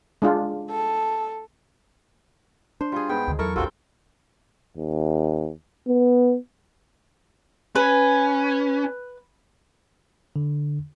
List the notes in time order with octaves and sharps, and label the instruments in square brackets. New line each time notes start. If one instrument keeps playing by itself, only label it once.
[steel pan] G#3 D4 F4
[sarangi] A4
[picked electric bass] D4 [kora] C5
[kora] G3 G#4 [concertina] F4
[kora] G#2 [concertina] B3 G5
[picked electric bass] D2 D3 D#3
[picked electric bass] E2 F#3 [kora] E4 A4 A#4 [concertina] C#6
[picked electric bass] A#1 E2 [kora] G2 C4 G5 [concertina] F4 F#4 A4
[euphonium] D#2
B3
[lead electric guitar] C#4 [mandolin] B4
[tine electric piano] D3